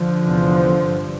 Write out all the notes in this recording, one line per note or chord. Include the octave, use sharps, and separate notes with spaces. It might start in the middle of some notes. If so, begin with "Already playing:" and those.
Already playing: D3 F3
E2 C3
G2